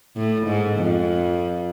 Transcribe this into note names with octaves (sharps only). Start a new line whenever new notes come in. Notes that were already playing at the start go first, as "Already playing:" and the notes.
A2
G#2
F2